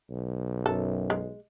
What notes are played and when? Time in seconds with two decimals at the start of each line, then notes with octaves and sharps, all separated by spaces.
0.11 B1
0.66 F#2 A4
1.10 G#3